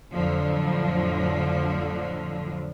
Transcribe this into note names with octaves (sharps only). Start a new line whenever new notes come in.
F2 A2 D3 F3 F#3